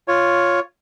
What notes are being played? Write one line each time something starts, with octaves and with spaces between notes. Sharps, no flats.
F4 C#5